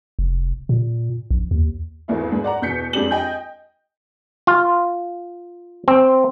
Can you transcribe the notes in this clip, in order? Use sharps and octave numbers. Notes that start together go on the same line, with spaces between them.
F1
A#2
A#1
D#2
G#1 E2 A3 E4
G#2
D5 F#5 A#5
E2 B2 G6 B6 C#7
F2 G#3 D4 G4 F#7
D#5 G5 G#5 G6
F4
C4